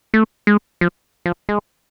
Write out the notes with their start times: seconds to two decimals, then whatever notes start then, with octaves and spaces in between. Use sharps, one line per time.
0.14 A3
0.47 G#3
0.81 F3
1.26 F3
1.49 G#3